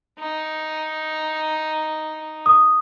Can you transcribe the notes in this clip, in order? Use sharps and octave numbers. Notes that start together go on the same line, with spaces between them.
D#4
D#6